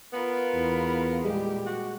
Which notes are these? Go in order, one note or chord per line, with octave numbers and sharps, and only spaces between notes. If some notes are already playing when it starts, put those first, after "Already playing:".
B3 F4 A#4 B5
E2
A#2 G3 G#3 G4
F#4